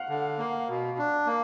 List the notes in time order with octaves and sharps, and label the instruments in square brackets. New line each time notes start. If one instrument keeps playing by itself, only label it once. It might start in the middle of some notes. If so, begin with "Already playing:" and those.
Already playing: [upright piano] F5 F#5
[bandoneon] D3
A#3
B2
D4
A#3